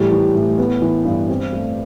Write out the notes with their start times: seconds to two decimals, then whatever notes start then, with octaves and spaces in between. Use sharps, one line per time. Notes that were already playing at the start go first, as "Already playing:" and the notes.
Already playing: A2 E3 G3
0.11 E3
0.35 A2
0.58 B3
0.82 E3
1.05 G2
1.29 C4
1.53 A3